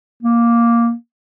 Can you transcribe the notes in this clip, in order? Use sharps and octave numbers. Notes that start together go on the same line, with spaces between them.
A#3